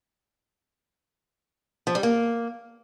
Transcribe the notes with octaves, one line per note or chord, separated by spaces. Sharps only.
F3
G3
A#3